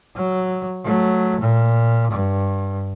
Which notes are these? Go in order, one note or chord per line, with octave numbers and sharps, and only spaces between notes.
F#3
F#3 A3
A#2
G2